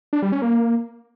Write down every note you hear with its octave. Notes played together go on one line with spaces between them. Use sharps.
D4
G3
C#4
A#3